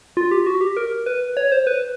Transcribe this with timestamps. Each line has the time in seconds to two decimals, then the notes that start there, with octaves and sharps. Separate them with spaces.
0.17 F4
0.31 G4
0.46 F#4
0.61 G4
0.77 A#4
1.06 B4
1.37 C#5
1.52 C5
1.67 B4